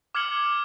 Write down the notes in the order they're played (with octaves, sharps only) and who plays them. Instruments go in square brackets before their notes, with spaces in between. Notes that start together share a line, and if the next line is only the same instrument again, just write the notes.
[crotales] D6 F6 G#6 C#7 F#7